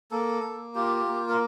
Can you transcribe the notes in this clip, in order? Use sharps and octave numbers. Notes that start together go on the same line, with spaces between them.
A#3 A4
A#3
F4 G4
A#3
A#4